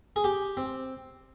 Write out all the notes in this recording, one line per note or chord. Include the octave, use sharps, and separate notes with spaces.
G#4
G4
C4